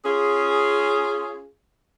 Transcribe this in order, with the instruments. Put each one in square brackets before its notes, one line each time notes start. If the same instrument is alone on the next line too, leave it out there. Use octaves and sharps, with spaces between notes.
[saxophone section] C#4 F4 G#4